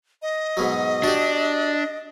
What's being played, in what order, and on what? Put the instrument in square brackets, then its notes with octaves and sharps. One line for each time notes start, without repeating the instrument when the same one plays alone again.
[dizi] D#5
[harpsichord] G#2 B2 F#3
[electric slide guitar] D4 [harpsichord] F#4 G4